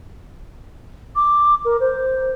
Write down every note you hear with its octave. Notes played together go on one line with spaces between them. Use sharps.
D6
A#4
C5